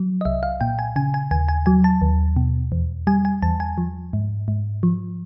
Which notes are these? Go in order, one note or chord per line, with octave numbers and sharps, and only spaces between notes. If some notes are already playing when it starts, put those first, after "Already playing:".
Already playing: F#3
D#5
C2 E5
F5
A#2 G5
G#5
C#3 G#5
G#5
D#2 G#5
G#5
F#3 G#5
A5
D#2
B2
E2
G3 G#5
G#5
E2 A5
G#5
F3
G#2
G#2
F3